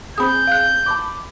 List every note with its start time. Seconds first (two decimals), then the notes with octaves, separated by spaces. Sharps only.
0.18 C4 G#4 B5 D#6 G6
0.47 F5 F#6
0.86 A5 B5 D6